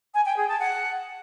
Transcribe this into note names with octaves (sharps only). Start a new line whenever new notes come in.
G#5
G5
G#4
A5
F#5